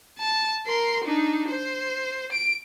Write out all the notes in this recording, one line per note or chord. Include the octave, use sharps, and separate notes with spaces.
A5
A#4 C6
D4 D#4
C5
D7